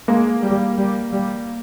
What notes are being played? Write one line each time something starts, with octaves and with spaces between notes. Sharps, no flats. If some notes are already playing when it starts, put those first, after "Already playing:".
G#3 A#3
G3
G3
G3